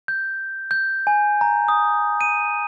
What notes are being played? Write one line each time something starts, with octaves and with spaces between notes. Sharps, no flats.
G6
G6
G#5
A#5
D#6
D#7